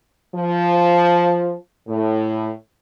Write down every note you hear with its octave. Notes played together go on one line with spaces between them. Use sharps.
F3
A2